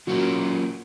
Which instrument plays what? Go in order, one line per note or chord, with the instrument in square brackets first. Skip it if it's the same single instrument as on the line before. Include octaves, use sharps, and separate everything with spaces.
[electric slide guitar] F#3 A#3 C#4 F4 A#4 [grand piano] F#4